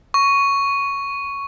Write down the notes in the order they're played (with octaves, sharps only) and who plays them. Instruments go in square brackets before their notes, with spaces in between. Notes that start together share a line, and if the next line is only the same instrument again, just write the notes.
[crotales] C#6